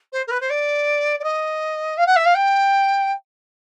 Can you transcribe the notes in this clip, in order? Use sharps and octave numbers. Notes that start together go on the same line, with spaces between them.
C5
A#4
B4
C5
D5
D5
D#5
F5
F#5
E5
F5
G5